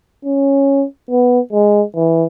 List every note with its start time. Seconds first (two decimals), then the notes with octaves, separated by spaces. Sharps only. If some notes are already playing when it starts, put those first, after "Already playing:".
0.25 C#4
1.10 B3
1.53 G#3
1.95 E3